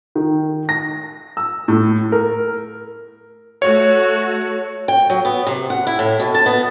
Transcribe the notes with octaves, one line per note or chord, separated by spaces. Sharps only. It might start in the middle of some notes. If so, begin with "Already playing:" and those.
D#3
A#6
E6
A2
A#4
A3 F#4 C#5
G5
F#3
B3
C3
F#5
E4
A2
B2
A5
B3